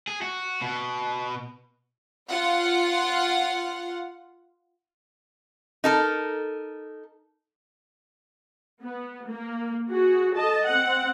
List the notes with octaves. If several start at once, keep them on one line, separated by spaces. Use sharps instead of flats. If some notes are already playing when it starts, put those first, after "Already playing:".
G#4
F#4
B2
F4 F5 F#5
D#4 A4 A#4
B3
A#3
F#4 G#4
A4 D#5 A5
C4 F#5